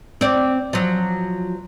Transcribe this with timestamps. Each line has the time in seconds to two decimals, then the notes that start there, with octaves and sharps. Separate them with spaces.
0.21 C4 D5
0.73 F3 F#3